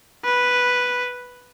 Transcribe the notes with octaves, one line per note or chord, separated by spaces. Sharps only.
B4